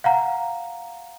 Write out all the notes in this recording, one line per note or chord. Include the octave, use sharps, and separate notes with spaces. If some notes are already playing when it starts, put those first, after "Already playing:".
F5 F#5 A#5